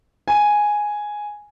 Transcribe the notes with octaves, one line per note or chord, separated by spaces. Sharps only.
G#5